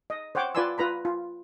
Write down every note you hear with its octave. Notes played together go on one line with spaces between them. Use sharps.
D#5
C5 C#5 F#5 G5 D6
F4 B4 D5 G#5 C6 E6
F4 B4 A#5 B5
F4